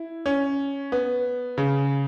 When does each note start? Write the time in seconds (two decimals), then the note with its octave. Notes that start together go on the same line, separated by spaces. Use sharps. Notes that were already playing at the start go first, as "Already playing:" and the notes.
Already playing: E4
0.26 C#4
0.92 B3
1.58 C#3